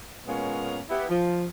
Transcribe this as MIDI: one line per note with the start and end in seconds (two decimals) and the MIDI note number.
0.27 0.80 46
0.27 0.80 56
0.27 0.80 58
0.27 0.80 59
0.27 0.80 61
0.27 0.80 73
0.90 1.07 59
0.90 1.07 64
0.90 1.07 67
1.09 1.46 53